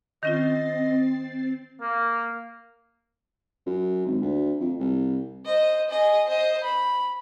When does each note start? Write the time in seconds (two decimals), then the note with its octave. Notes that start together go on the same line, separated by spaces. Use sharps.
0.23 D#3 C4 C#4 F4 D#5 A6 C7
1.81 A#3
3.66 F#2
4.06 G#1
4.21 D2
4.60 F2
4.80 C2
5.45 C5 D#5
5.90 G#4 D#5
6.28 C5 D#5
6.63 B5